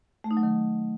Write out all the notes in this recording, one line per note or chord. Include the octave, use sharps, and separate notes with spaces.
A3
D#4
F#3
D#3